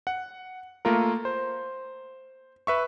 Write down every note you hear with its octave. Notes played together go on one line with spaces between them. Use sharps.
F#5
A3 A#3 F4 A#4
C5
B4 E5 C#6